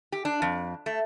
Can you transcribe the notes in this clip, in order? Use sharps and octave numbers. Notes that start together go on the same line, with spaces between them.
G4
D4
F2
A3